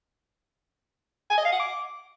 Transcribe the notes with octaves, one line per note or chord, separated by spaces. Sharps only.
G#5
D#5
F5
F#5
D6